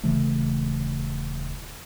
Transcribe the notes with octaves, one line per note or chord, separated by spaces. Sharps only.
D#1 C#3 E3 A3